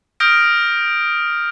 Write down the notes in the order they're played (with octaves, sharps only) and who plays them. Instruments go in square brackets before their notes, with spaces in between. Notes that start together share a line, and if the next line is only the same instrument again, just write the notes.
[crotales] D#6 F6 G6 A#6 D7